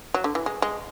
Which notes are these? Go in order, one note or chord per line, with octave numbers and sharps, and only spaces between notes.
F#3
D3
E3
G#3
G#3